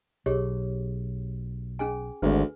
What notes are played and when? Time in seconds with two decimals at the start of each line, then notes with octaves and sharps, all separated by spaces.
0.26 B1 G4 G#4 C#5
1.79 C#4 G#4 G#5
2.22 G#1 D2 B4